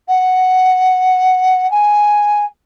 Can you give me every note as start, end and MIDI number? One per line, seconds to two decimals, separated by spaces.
0.08 1.69 78
1.71 2.45 80